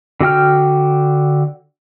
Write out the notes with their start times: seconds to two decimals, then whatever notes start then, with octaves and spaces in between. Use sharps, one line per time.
0.21 D3 F#4 G5 F6